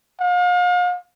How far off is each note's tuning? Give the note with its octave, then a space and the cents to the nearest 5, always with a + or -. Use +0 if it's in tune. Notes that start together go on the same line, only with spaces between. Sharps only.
F5 +40